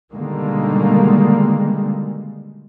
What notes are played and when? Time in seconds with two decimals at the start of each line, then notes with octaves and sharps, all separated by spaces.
0.13 B2 D3 D#3 G3 G#3 A#3